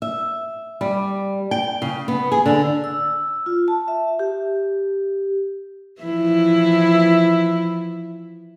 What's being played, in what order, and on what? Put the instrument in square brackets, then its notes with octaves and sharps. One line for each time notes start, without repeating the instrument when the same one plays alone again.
[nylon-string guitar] E5
G3
G5
C#3
B3
G#4
D3
[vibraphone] E6
F4
A5
E5
G4
[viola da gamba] E3 F3 E4